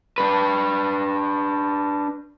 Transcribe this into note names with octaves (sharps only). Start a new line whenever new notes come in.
D4 B4